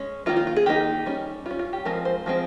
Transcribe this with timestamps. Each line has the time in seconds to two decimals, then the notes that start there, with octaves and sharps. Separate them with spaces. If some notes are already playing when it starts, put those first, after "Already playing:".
Already playing: G#3 C#4
0.26 D#3 A#3 D#4 F4
0.37 F4
0.47 F4
0.56 G#4
0.66 D#3 A#3 D#4 G4
1.06 G3 C#4
1.46 G3 C#4 F4
1.59 F4
1.73 G4
1.85 F3 G#3 C4 A#4
2.05 C5
2.26 F3 G#3 C4